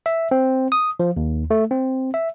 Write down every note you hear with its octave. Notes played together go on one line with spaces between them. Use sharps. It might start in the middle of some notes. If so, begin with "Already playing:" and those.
E5
C4
D#6
F3
D#2
A3
C4
E5